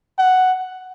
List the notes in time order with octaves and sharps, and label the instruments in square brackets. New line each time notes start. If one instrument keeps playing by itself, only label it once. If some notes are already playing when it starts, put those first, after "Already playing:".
[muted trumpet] F#5